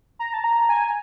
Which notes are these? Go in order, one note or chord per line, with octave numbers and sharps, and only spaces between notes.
A#5
A5
A#5
G#5